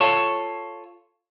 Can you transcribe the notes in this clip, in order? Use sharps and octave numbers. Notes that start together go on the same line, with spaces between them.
F4 A4 C#5